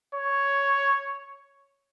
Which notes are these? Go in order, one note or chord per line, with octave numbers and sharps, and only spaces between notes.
C#5